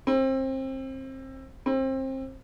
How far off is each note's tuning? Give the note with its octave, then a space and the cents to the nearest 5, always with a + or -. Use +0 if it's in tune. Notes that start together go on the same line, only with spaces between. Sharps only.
C4 +25
C4 +25